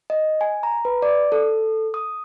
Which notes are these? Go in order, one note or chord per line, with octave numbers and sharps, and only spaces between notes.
D#5
G#5
A#5
B4
D5
A4
D#6